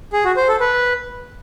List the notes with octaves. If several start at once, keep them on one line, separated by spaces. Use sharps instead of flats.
G#4
F#4
C5
A4
B4